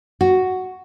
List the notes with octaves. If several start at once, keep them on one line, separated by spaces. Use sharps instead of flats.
F#4